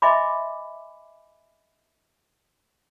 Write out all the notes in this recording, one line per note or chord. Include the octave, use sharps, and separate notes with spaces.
D#5 E5 G#5 B5 C6 D6